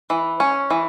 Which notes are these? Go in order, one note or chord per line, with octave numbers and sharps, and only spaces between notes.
E3
C#4
E3